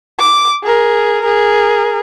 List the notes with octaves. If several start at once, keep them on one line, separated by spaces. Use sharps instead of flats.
D6
G#4 A#4
G#4 A#4